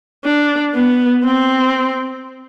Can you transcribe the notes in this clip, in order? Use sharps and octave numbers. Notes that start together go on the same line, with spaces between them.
D4
B3
C4